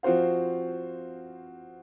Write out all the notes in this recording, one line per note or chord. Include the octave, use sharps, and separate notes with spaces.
F3 C4 F#4 C5 F5